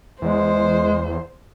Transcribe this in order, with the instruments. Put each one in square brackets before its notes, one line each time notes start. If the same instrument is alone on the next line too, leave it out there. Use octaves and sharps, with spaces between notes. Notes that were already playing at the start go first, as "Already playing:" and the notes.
[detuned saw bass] E2 [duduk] G#3 [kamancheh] C5